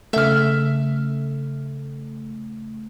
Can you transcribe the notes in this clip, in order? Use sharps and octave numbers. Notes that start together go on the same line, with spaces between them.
C#3 A3 E5 F6